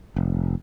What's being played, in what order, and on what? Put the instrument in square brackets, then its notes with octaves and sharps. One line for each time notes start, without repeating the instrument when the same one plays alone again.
[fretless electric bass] F1